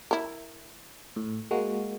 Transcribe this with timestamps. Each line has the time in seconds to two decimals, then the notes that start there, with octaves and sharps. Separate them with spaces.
0.11 E4 A#4
1.16 A2
1.51 G#3 A#3 F#4